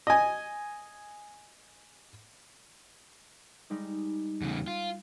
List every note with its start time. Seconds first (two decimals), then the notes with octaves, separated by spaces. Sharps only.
0.07 D#5 G#5
3.70 G3 G#3 D#4
4.41 E2 C#3
4.68 F4